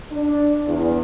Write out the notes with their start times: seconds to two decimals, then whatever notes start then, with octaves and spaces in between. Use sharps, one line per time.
0.12 D4
0.67 E2